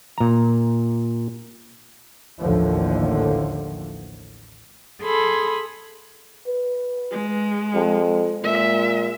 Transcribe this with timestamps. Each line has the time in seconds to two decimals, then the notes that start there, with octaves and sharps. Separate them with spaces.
0.18 A#2 A#5
2.41 A1 D#2 A2 D3 F3
5.01 G#4 A4 B5 C6
6.47 B4
7.11 G#3
7.75 F2
8.43 A#2 G#3 E5